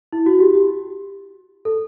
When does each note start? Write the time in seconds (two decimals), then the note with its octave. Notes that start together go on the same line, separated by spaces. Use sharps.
0.13 E4
0.26 F#4
0.39 G4
0.53 G4
1.65 A4